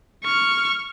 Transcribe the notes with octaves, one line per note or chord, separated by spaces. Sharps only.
C#6 F6